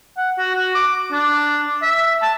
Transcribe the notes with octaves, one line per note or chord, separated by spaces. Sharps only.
F#5
F#4
F#4
D6
D4
E5
A5